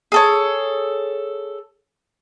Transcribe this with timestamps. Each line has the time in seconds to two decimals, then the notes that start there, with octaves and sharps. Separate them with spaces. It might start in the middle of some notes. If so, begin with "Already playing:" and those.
0.12 G#4 A4 C#5